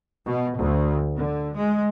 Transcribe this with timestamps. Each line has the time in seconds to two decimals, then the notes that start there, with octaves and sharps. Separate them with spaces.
0.26 B2
0.57 D2
1.16 D3
1.57 G#3